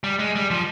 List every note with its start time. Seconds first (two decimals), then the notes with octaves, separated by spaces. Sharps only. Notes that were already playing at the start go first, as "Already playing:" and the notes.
0.04 G3
0.19 G#3
0.36 G3
0.51 F3